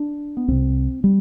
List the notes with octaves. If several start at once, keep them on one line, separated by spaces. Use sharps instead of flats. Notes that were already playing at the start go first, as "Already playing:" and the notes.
Already playing: D4
B3
C2 C3 C4
G3